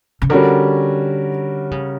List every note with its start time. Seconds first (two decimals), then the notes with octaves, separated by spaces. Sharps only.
0.22 C#3
0.30 D3 G3 C#4 F#4 A#4
1.71 C#3